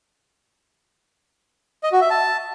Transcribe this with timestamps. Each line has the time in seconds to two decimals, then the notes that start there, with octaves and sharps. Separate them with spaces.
1.83 D#5
1.92 F#4
2.01 E5
2.10 A5